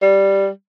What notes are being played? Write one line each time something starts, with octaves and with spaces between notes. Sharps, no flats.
G3